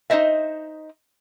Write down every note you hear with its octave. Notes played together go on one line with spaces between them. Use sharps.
D#4 E4 C5 D#5 E5